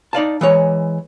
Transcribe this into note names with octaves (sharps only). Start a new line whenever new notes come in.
D#4 D5 F5 A5
E3 G#3 C#5